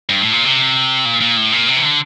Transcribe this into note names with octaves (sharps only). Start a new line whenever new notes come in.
G2
A2
A#2
C3
A#2
A#2
A2
A#2
C3
E3
D3